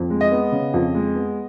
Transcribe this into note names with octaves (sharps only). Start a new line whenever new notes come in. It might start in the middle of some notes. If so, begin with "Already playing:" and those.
Already playing: F2
G#3
D#5
B3
C#3
F2
G#3
B3